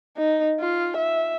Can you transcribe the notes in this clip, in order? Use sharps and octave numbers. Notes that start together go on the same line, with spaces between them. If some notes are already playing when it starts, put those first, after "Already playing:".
D#4
F4
E5